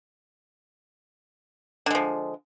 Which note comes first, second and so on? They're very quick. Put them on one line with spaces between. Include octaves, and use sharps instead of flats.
D3 G#3 F3